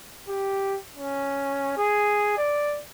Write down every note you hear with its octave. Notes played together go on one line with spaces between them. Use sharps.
G4
C#4
G#4
D5